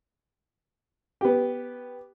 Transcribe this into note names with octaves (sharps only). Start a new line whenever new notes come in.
B3 G4